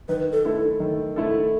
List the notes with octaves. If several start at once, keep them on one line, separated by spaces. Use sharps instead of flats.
D#3 B4
A4
A3 E4 A4
D#3
A3 E4 A4